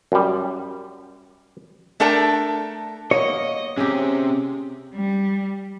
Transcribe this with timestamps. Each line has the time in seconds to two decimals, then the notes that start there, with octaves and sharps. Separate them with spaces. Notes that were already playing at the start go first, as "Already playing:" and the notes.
0.12 F#2 G3
2.00 A3 D4 A4 A#4 G5
3.11 A#3 B3 C#5 D#5
3.77 C3 C#4 G4 G#4
4.95 G3